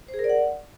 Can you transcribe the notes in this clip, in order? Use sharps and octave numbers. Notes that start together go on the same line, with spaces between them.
C5
G#4
A#4
D5
F#5